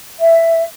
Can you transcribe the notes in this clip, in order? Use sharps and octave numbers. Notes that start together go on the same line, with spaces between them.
E5